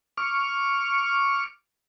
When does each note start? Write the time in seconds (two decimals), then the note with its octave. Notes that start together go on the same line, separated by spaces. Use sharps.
0.17 C#6 D6 F6